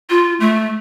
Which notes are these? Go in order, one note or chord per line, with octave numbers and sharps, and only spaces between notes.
F4
A3